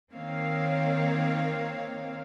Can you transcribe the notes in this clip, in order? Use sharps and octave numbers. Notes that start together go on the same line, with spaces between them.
D#3 A#3 C4 C#5 F5